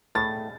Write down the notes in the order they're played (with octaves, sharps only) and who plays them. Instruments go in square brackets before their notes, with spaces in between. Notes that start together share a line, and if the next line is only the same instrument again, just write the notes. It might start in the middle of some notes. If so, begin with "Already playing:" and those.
[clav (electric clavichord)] A2 [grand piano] A6